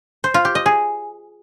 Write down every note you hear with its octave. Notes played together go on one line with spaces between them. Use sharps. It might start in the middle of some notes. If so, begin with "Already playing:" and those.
C5
F4
G4
D#5
G#4